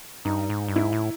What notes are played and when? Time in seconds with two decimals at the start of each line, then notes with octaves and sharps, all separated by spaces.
0.25 G2 D#4
0.50 G#2
0.68 G2
0.76 G#2 E4
0.92 A2